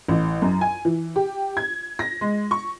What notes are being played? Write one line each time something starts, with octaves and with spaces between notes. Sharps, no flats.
A1
F#2
G#5
E3
G4
G#6
A#6
G#3
C#6